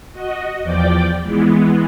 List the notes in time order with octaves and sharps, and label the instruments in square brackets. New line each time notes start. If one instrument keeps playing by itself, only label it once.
[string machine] F#4 D#5
E2 F3 D5 G5 D6
E3 G#3 B3